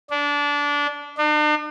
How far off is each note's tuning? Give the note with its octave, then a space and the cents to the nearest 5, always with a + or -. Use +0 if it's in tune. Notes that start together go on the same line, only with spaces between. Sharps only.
D4 -20
D4 +45